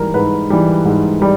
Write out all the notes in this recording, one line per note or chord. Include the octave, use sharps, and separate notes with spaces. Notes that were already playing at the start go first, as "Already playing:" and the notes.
Already playing: G#2 E3 G3 A#4
G#2 B4
E3 G3
G#2
G3